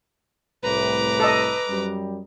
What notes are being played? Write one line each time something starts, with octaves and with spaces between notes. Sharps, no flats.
C2 A2 B4 A#5 D6
A4 D#5
F#2 G3